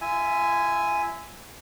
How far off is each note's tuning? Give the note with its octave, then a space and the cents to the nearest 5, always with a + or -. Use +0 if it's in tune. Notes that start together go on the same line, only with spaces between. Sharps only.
F4 -40 E5 -5 G#5 +0